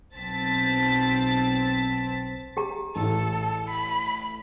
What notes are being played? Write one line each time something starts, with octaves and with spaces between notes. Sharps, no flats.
B1 C4 A5 A6 B6
G4 G#4 A#5
A1 A2 A4
B5